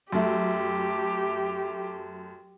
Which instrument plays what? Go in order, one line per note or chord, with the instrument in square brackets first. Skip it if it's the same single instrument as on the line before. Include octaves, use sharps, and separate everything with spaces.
[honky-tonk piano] F#2 A3 [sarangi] G4